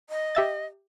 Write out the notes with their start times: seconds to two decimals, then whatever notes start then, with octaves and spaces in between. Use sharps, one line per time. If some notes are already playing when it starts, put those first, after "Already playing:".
0.10 D#5
0.35 G4 E5 A6